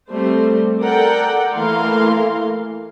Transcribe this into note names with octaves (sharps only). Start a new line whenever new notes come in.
G3 A3 C4 C5
A4 A#4 D5 F#5 G5
E3 A3 A#3 A#4 F5 C6